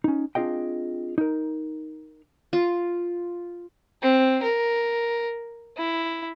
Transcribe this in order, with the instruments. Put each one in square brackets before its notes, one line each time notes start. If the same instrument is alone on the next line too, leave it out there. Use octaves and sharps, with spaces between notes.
[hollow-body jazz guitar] C#4 D#4
C4 D4 F4 G#4 D#5 G5
D#4 A#4
[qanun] F4
[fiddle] C4
A#4
E4